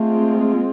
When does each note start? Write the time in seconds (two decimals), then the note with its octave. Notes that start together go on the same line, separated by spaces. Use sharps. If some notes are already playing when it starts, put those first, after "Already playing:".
Already playing: G#3 A3 C4 F4
0.55 A#3